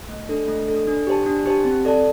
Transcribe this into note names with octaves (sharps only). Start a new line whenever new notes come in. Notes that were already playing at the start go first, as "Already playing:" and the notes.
A3
D4 A4
A3
D4 A4
D4
G4 C5 A5
D4
G4 C5 A5
C4
A4 D5 A5